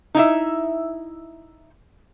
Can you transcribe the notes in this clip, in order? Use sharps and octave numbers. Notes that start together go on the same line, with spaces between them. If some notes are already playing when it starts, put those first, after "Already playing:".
D#4 E4 E5